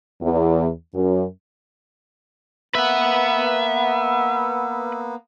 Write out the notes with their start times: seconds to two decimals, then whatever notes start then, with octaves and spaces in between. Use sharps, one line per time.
0.21 E2
0.95 F#2
2.75 A#3 B3 B4 E5 F#5